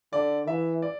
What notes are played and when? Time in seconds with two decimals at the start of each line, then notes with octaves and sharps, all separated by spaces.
0.12 D3 D5
0.47 E3 E5
0.82 D5